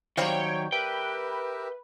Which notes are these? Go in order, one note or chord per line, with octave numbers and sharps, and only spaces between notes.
D#3 F#3 G3 C4 C#5 F5 G5
G4 A#4 B4 E5 G5